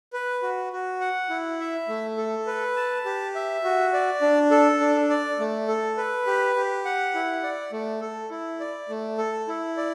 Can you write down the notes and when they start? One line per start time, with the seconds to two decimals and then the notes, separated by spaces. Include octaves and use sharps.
0.13 B4
0.42 F#4
0.73 F#4
1.01 F#5
1.30 E4
1.60 E5
1.88 A3
2.17 A4
2.47 B4
2.76 A5
3.05 G4
3.35 E5
3.64 F#4
3.93 D5
4.22 D4
4.51 A4
4.80 D4
5.10 D5
5.39 A3
5.68 A4
5.97 B4
6.27 G4
6.56 G4
6.85 F#5
7.15 E4
7.43 D5
7.72 A3
8.01 A4
8.30 E4
8.60 D5
8.89 A3
9.18 A4
9.48 E4
9.77 D5